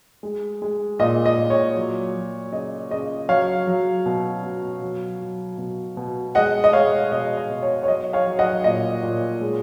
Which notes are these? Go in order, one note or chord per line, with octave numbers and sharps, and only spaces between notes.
G#3
G#3
A#2 D#5
D#5
A#2
C#5
F#3
F#3
C#3 D#5
C#3 D#5
F#3 C#5 F5
F#3
B2
B2
F#3
F#3
B2
B2
G#3 D#5 F#5
D#5
G#3 C#5 F5
B2 D#5
D#5
B2
C#5
C#5
F#3 D#5
C#5 F5
F#3
D#5 F#5
A#2 D#5
A#2
G#3